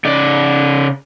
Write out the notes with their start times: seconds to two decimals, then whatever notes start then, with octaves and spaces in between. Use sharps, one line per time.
0.05 C#3 D5